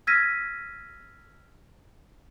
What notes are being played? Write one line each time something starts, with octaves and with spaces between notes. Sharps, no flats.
E6 F6 G#6 A#6 B6 D#7